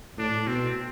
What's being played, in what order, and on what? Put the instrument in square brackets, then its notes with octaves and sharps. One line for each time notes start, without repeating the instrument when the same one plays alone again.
[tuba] A2 [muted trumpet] D4
[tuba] B2 [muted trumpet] C4